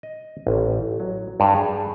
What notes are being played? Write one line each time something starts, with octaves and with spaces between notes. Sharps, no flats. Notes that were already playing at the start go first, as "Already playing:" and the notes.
D#5
A1
F#3
G2
G#4